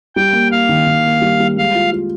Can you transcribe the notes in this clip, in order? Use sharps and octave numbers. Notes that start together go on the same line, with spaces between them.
G3 G5
A#3
A#3 F5
D#3
D#3
A#3
G3
G3
G#3 F5
F4
F4